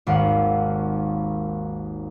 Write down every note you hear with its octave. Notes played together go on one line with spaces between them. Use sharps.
G#1 D#2 F5 F#5